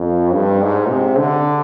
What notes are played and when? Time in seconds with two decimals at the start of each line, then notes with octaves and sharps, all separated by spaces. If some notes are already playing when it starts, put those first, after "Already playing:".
Already playing: F2
0.34 G2
0.62 G#2
0.90 C3
1.18 D3